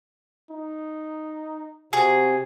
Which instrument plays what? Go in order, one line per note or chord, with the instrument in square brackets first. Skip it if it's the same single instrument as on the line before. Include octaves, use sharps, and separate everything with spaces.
[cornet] D#4
[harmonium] C3 [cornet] F#4 [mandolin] G#4